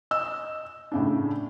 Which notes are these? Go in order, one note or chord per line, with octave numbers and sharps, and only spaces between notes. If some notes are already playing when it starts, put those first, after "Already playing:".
D#5 E6
A2 C#3 D4